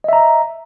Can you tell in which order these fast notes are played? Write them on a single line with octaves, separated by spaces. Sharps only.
D#5 E5 A#5